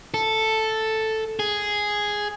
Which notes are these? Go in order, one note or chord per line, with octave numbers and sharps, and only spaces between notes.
A4
G#4